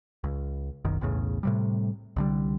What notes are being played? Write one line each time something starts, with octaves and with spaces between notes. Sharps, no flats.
C#2
F#1 B1 F#2 D#3
B1 E2 A2 C#3
A2 C3 G3
C2 D3 G3